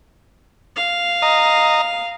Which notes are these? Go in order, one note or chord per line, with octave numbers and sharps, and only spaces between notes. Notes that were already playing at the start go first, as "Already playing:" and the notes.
F5
D#5 A#5